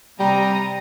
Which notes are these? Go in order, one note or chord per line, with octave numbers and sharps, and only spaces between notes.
C3 G3 A#5 D#6